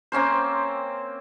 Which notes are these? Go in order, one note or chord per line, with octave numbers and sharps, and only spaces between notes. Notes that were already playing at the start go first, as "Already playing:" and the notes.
A#3 C4 C#4 C5